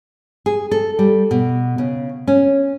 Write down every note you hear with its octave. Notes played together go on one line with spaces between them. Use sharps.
G#4
A4
G3
B2
C#3
C#4